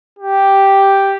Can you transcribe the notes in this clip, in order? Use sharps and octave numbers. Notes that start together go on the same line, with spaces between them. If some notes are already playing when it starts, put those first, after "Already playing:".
G4